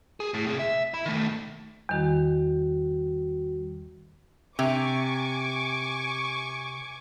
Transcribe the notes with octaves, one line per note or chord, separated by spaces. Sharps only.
G#4
A2
C3 G#4
E5
E4
D#3 A3
E2 D#3 G3 F#4
C3 G#5 C#6 D6